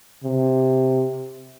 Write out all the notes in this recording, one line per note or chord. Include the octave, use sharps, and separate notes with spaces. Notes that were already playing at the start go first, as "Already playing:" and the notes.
C3